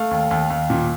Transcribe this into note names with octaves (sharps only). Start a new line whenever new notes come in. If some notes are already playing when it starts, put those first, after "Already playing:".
Already playing: A3 F5
D#2
D#2
D#2
A#2